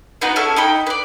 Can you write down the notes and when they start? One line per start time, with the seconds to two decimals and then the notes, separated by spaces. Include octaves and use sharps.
0.21 B3 D#4 F#4 B4
0.36 C#4 E4 G#4 A4
0.56 D#4 G5 B5
0.87 B4 D5